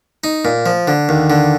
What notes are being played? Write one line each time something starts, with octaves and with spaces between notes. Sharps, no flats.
D#4
A#2
F3
D3
D#2
D3